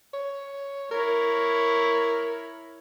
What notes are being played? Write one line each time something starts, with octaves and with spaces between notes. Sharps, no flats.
C#5
E4 A#4 C#5